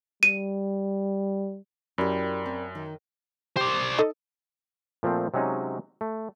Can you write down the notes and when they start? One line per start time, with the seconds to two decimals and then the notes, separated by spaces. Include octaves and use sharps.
0.23 G3 D#7
1.98 F#2 E4 G4 A#4 D5 B5
2.46 C4
2.75 D#3
3.57 G4 C5 D5
3.98 D#4 A4 D#5
5.03 A#2 F3 A3 C4
5.34 C3 F#3 G#3 C#4 D#4
6.01 A3